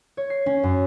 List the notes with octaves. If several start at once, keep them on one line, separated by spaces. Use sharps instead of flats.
C#5
C7
C#4
F#2